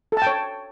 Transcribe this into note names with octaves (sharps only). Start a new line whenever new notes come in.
A4 C#5 G5 A5